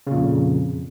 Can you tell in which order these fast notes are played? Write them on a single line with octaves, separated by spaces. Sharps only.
C#3 A#2 F2